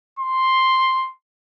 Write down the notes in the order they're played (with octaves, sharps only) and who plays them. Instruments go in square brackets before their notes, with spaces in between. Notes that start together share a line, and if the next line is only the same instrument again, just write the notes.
[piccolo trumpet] C6